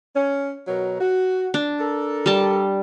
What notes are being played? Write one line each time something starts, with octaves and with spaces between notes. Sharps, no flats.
C#4
B2 F#3 A#4
F#4
D4
A4 A#4
G3 A5